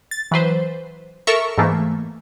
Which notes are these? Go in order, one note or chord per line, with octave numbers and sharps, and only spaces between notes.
A6
E3 F#3 B4 C5
A4 A#4 E5 C#6
G#2 E3 A3 A#3